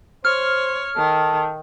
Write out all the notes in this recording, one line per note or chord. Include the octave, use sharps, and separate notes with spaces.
C5 C#5 F6
D#3 A4